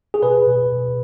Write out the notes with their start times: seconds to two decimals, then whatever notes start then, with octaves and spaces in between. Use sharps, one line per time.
0.14 G#4
0.22 B2 B4
0.47 B2
0.73 B2